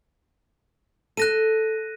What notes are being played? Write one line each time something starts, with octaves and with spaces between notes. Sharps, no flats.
A4 F#6 A#6 D#7